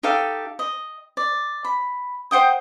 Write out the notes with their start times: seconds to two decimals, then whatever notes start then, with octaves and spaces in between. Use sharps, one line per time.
0.03 D#4 G4 A4 F5
0.59 D#5
1.17 D5
1.65 B5
2.31 C5 F#5 G5 D#6